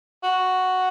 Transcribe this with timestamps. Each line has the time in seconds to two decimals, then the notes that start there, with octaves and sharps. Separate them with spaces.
0.23 F#4